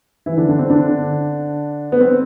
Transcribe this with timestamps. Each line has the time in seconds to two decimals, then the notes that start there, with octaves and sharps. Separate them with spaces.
0.26 E3 E4
0.37 D3 D4
0.49 D3 D4
0.59 C4
0.70 D3 D4
1.92 B3
2.01 C4